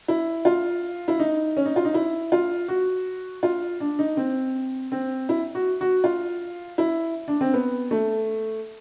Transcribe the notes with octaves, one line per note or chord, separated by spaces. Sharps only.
E4
F4
E4
D#4
C#4
D#4
F4
D#4
E4
F4
F#4
F4
D4
D#4
C4
C4
E4
F#4
F#4
F4
E4
D4
C4
B3
A3